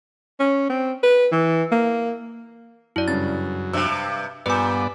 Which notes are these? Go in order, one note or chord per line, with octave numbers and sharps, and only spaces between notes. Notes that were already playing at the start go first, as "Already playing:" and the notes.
C#4
C4
B4
E3
A#3
F#2 E4 D5
G2 C#3 A6
G2 C3 E6
G2 A#2 B3 B4 D5 G#5